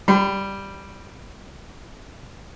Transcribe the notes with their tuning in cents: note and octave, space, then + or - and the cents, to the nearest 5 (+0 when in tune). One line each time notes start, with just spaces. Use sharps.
G3 +0 B5 +40